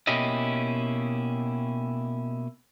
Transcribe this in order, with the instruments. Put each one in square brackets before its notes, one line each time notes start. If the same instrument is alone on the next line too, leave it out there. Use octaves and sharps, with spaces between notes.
[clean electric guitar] B2 A#3 C#4 E4 G4 D#5